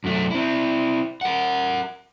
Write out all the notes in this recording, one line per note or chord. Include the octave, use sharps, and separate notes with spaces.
F#2 A3
C4 E4
A#4 F#5